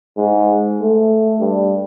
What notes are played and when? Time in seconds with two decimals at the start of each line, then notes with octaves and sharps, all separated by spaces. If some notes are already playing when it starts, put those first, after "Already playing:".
0.17 G#2
0.81 A3
1.40 G2